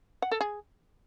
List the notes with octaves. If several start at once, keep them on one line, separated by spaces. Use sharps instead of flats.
F#5
A4
G#4